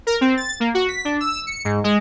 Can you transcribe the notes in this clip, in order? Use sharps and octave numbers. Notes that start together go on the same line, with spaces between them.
A#4
C4
A6
A#3
F#4
B6
D4
E6
C#7
G#2
G#3